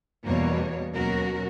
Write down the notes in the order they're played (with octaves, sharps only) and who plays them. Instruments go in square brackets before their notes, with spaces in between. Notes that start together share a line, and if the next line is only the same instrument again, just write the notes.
[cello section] E2 B2 G3 A#3 C#5
D#2 B2 F#3 C#4 F#4 A#4